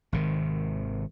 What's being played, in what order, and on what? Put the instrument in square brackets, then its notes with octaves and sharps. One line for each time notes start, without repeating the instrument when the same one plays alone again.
[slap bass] G#1 C3 D#3